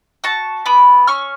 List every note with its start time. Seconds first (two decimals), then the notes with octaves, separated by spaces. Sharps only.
0.24 F#4 A5 C#6
0.66 B3 B5 D6
1.07 C#4 C#6 F6